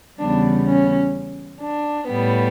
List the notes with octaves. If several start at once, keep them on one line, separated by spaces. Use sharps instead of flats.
E2 C#3 G3 B3 D4
C#4
D4
A2 G3 B3